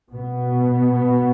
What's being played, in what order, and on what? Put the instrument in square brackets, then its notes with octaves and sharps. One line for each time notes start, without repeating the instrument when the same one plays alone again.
[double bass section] B2 B3